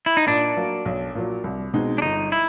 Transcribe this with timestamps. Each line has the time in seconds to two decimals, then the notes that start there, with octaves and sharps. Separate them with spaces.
0.06 E4
0.17 D#4
0.28 A#2 D4
0.57 F#3 A#3
0.85 B1
1.15 A#2 F#3
1.44 C2
1.73 B2 G#3 C4 D#4
1.98 D4
2.02 G1 D#4
2.32 E4